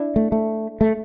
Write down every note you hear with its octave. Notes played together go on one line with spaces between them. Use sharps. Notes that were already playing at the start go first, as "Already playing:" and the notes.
Already playing: D4 E4
A3
A3
A3